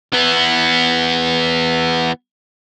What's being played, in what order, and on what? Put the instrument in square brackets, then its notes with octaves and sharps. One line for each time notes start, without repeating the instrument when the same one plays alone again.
[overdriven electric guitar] E3 B3